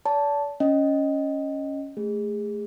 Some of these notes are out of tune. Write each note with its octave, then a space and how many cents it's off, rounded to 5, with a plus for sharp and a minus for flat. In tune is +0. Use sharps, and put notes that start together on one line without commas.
D5 -40 A5 +0
C#4 +0 D#5 +0
A3 -5 G#4 -25